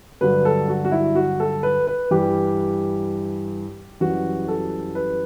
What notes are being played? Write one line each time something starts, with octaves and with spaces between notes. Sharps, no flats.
G2 D3 F#3 B4
A4
F#4
F#4
E4
F#4
A4
B4
B4
G2 E3 G3 G4
F#2 E3 G3 F#4
A4
B4